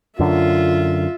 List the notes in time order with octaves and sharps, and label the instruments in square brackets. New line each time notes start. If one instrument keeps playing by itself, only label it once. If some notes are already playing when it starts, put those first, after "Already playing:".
[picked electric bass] F#2 D3 [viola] F4 E5